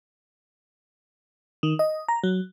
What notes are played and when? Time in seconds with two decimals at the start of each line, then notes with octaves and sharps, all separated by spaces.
1.63 D#3
1.79 D#5
2.08 A#5
2.24 F#3